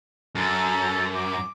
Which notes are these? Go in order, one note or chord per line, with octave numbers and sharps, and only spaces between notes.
F#2 A4
D6